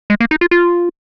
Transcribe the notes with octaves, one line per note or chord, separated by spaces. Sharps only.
G#3
A#3
D#4
F4
F4